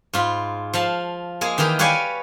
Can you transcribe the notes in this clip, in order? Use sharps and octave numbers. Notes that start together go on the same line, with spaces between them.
G#2 F4 B5
F3 F5 A5
G#3 A#3 G#4
D#3 E3 G4 A#4
G4 B4 C#5 D5 F5 G#5